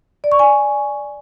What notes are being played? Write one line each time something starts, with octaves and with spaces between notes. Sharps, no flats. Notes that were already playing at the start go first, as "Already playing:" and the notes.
D5
C#6
G#5